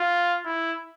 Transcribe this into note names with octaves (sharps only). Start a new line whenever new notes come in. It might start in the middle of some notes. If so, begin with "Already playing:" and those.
Already playing: F4
E4